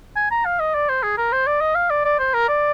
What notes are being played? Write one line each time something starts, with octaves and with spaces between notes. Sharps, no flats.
G#5
A#5
F5
D#5
D5
C5
G#4
A#4
C5
D5
D#5
F5
D5
D5
C5
A#4
D5